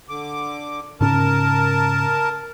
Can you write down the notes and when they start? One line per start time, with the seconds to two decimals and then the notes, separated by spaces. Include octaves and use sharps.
0.09 D3 D6
1.01 G#2 C#3 C#4 A#4 A5